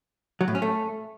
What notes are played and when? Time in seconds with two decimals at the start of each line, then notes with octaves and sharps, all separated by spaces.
0.41 F#3
0.48 A2
0.55 C#4
0.62 A3